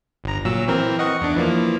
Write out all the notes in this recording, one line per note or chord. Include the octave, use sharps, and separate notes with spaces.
G1 A#5
A#2 F#3 E6
E3 C4 A#4
D#5 F#5 C#6
E2 D4
E3 F3 A#3